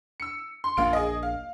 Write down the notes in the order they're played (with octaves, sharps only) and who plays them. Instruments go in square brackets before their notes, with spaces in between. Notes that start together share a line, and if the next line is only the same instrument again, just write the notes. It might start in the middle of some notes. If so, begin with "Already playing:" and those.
[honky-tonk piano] E6 C#7
C6
[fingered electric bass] A#1 A#3 D4 [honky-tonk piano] F#2 F4 D7
[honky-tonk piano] G#4 D#5
F5